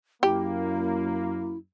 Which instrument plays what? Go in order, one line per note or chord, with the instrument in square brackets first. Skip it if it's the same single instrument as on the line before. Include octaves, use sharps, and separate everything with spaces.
[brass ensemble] F#2 A#3 [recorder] E4 [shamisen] G4